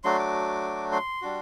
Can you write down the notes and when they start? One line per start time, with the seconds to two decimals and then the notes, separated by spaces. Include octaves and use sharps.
0.04 F#3 A3 D4 F#4 C6
0.19 D6
0.92 C6
1.22 G3 D4 F#4